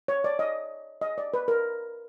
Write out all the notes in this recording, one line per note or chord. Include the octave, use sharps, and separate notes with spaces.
C#5
D5
D#5
D#5
D5
B4
A#4